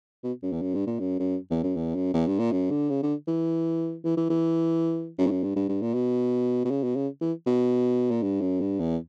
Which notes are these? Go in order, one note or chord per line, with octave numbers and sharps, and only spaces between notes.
B2
F#2
E2
F#2
G2
A#2
F#2
F#2
E2
F#2
E2
F#2
E2
G2
A#2
F#2
D3
C#3
D3
E3
E3
E3
E3
F#2
G2
F#2
G2
G2
G2
A#2
B2
B2
C#3
B2
C#3
E3
B2
A#2
G2
F#2
G2
E2